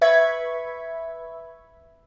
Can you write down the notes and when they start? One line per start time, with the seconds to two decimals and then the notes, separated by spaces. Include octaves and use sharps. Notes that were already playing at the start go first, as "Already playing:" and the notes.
0.02 B4 E5 B5 C#6 G#6